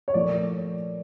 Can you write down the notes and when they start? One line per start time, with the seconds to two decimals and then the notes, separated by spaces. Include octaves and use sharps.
0.08 C#5
0.14 A#2 F3 A3 D5